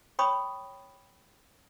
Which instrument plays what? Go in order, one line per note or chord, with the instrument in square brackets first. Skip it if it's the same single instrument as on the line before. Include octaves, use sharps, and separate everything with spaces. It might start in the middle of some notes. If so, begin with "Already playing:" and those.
[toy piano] C#5 G5 B5 C#6 D#6